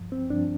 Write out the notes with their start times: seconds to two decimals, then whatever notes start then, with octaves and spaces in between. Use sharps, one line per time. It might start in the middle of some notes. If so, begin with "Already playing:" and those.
Already playing: G2 F3
0.12 C4
0.30 G2 F3 D4